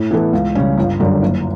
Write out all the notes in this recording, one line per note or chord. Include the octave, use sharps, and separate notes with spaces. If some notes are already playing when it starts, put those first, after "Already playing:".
Already playing: A2
E3 B3 E4 A4
C#2
C#3 G3 C#4
G1
F#2 D3 G3
F#1